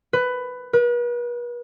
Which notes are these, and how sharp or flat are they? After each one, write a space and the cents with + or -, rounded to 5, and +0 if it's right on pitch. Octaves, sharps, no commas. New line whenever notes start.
B4 +15
B4 -40